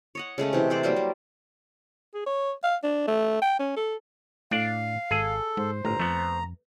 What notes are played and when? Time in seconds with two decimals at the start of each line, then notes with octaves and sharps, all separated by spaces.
0.15 C#5 D#5 F#5
0.38 C#3 G#3 A3 C#4
0.53 C3 E3
0.70 A3 C5 D5
0.83 F#3 G3 A#3 C5
0.96 A#3
2.14 G#4
2.26 C#5
2.64 F5
2.83 D4
3.07 A3
3.42 G5
3.60 C#4
3.76 A4
4.51 A2 D4 D5 F5
5.11 G#1 G#4 A4
5.57 G#2 C5
5.85 G1 A2 A#5
6.00 F2 A3 B3